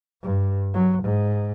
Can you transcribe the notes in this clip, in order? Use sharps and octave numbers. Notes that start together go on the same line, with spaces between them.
G2
F#3
G#2